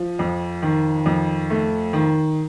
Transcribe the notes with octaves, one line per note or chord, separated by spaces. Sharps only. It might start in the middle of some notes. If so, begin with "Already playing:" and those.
Already playing: F3
F2
D#3
F2
A3
D#3